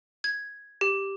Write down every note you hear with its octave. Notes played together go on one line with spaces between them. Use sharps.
G#6
G4